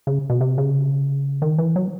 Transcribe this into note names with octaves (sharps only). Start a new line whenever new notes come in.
C#3
B2
C3
C#3
D#3
E3
F#3